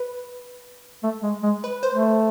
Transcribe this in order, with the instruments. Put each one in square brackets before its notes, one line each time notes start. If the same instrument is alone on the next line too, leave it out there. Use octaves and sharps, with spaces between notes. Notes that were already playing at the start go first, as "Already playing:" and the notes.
Already playing: [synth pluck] B4
[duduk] A3
G#3
G#3
[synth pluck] B4
C5
[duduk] A3